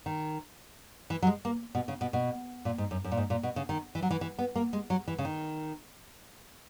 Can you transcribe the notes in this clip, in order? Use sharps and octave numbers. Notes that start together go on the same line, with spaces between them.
D#3
E3
F#3
G#3
A#3
B2
C#3
B2
B2
A#2
G#2
F#2
F#2
A#2
G#2
A#2
B2
C#3
D#3
E3
F#3
E3
E3
B3
A#3
G#3
F#3
E3
C#3
D#3